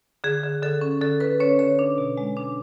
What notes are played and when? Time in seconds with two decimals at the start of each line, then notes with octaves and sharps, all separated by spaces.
0.24 D3 G#4
0.43 D3
0.63 D3 A4
0.81 C#4
1.01 D3 A4
1.20 D3 B4
1.40 C#4 C#5
1.59 D3 C#5
1.79 D4
1.98 B2
2.17 G#3
2.37 D4